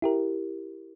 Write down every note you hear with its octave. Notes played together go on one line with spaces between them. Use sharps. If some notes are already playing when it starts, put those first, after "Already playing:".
E4 G4 A#4